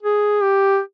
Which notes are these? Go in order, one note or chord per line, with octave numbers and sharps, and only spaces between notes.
G#4
G4